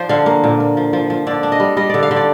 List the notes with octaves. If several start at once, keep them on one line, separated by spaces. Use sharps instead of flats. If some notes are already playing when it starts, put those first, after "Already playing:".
Already playing: F3 C5 D5
D3 F5
A#3
A#2
A#3
F3
F3
F3
D3 D5
D4
D#5
G3
G3 D#5
D3 D5
F5
D3
D5